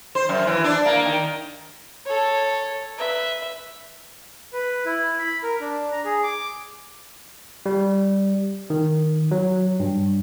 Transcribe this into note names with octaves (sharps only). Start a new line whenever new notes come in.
C5
F#2
E3
D4
A#3
D#3
A4 C#5
B4 E5
B4
E4
B5
A#4
D4
A#5
G#4
D6
G3
D#3
F#3
G2